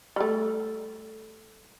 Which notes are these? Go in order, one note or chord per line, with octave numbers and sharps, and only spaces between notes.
G3 A3